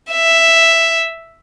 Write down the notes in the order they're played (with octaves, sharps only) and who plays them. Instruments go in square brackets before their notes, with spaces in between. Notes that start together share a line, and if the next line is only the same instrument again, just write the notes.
[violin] E5